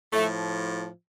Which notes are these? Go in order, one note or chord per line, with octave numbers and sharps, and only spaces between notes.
A2 F3 A3